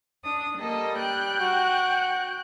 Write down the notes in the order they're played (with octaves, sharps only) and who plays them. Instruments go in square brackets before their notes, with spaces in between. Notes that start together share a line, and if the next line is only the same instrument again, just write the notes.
[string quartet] D4 D#6
[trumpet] G3 [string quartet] A#3 A4 D#5
[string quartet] G5 F#6 G6
[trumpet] F#4